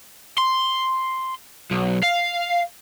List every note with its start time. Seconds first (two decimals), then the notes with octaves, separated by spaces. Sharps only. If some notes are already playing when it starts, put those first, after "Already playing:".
0.38 C6
1.72 B1
2.04 F5